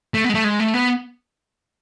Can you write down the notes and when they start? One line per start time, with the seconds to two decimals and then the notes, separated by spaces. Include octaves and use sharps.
0.14 A3
0.24 B3
0.29 G#3
0.34 A3
0.44 G#3
0.60 A3
0.74 B3